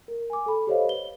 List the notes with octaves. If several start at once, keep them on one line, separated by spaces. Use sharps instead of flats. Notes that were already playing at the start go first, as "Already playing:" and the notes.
A#4
G#5 D6
A4 B5
G4 A4 C5 C#5 D#5 F5
B4 G7